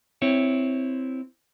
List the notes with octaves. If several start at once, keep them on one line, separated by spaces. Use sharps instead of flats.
C4 E4 C#5